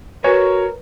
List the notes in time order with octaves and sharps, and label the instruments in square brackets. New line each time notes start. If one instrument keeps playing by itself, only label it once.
[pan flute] F#4 [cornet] A#4 [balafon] B4 G#5 [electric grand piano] C#5